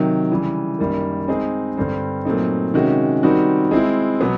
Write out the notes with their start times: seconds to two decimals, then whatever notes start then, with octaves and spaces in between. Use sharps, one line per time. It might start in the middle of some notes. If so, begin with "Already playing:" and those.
Already playing: C3 D#3 F#3
0.31 C#3 E3 G3
0.79 F#2 D#3 G3 A#3
1.28 G#3 C4 D#4 G#4
1.77 G2 D3 G3 C4
2.25 A#2 F#3 A3 C4 D#4
2.74 C3 D#3 G#3 C#4 F#4
3.23 D#3 G3 C4 D#4 F#4
3.71 G#3 C4 E4
4.21 B2 F#3 B3